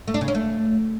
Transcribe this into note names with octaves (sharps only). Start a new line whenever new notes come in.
A3
D4
C#3
C#4
A3